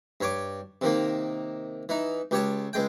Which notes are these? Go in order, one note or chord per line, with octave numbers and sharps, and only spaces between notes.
G2 C#5 D6
C3 D#3 A#3
E3 D#4
C#2 G4 C#5 A5
C#2 G#3 G5